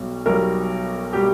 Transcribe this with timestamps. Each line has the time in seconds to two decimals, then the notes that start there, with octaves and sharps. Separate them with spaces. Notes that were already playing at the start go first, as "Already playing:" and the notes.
Already playing: B1 B2 G3
0.26 B1 B2 G3 A#4
1.13 B2 G3 G4